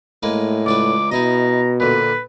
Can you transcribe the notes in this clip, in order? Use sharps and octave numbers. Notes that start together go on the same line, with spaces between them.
A2 G#3 A#3 B4
C#2 D4 B4 D6
B2 D#4 E4 D#5 A#5
A#2 D3 B4